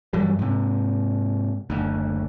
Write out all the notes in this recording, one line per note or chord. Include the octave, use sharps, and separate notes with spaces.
G2 E3 F#3 G3
G#2 C3
F#1 D2